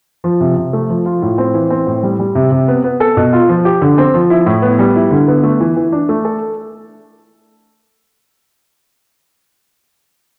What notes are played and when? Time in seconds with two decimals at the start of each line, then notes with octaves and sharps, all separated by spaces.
0.24 F3
0.40 C3
0.57 C3
0.73 A3
0.90 F3
1.06 F4
1.22 A2
1.38 C4
1.54 E3
1.70 C4
1.87 A2
2.03 G3
2.19 G3
2.35 C3
2.52 C3
2.68 B3
2.84 B3
3.00 A4
3.17 B2
3.33 F4
3.49 F3
3.65 G4
3.82 D3
3.98 C4
4.14 F3
4.30 E4
4.46 A2
4.62 B3
4.79 G3
4.96 E4
5.11 D3
5.28 B3
5.43 A3
5.60 E3
5.76 E3
5.92 D4
6.09 A3
6.25 A4